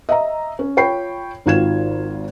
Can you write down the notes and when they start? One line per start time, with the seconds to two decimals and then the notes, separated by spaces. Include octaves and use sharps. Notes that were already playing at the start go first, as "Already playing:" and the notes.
0.09 D#5 E5 A#5
0.59 C#4
0.77 F4 C#5 G5 B5 C7
1.46 G#1 D#3 F4 F#4 G#6 E7